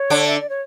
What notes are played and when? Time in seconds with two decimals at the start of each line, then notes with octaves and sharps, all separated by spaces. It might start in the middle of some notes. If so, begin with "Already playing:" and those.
Already playing: C#5
0.10 D3 D4
0.27 E5
0.39 D5
0.49 C#5